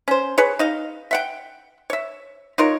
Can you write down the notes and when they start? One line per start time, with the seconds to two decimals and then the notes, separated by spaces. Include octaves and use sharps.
0.08 C#4 C5
0.38 G#4 B4 C#5
0.59 D#4 D#5 F5
1.11 E5 F#5 G5
1.90 C#5 E5
2.58 D#4 F4 A#4 C#5